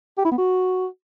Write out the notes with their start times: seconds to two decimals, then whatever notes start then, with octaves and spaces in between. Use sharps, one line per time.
0.18 G4
0.25 E4
0.31 B3
0.38 F#4